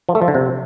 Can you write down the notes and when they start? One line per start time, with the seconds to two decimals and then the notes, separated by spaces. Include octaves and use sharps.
0.09 F3
0.15 A3
0.22 F3
0.28 D3
0.35 C3